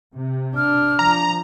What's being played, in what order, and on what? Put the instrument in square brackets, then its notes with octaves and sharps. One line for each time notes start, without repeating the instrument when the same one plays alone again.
[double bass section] C3
[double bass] D4 [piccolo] F6
[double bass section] F3 [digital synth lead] A#5